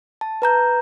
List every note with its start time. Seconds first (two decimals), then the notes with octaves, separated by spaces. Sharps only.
0.21 A5
0.42 B4 A#5 G6